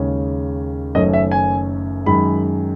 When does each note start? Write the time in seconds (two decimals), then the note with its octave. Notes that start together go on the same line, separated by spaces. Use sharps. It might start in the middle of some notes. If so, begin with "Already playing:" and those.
Already playing: D#2 C#3 G#3 C#4
0.95 F#1 F#2 D#3 A3 C#4 D#5
1.13 E5
1.31 G#5
2.06 F#2 D#3 G#3 D#4 B5